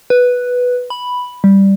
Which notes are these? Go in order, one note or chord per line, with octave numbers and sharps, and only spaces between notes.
B4
B5
G3